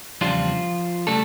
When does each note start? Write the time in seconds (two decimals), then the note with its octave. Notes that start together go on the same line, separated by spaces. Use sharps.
0.21 E2 C#3 F3 G3 D4 F4
1.07 C#3 G3 A3 D4 A4